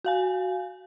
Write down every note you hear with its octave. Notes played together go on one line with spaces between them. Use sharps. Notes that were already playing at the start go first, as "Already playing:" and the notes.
F#4 F5 G#5